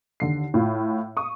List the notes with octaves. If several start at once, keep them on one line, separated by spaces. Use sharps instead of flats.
D#2 D3 C7
A2 F4
C#6 D#6